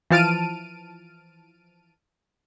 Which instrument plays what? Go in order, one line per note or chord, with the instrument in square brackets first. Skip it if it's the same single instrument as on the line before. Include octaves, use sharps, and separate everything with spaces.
[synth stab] E3 F3 A5 F6 D7 D#7